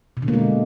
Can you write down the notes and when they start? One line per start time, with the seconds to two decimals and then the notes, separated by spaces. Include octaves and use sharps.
0.17 B2
0.22 D3
0.28 A#3
0.34 G#3